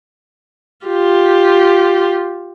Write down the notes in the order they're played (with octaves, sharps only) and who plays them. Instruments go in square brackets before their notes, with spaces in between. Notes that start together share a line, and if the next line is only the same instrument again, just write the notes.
[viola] F4 G4